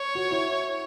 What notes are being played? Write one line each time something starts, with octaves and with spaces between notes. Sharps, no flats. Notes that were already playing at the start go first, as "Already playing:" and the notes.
Already playing: C#5
F#4
E4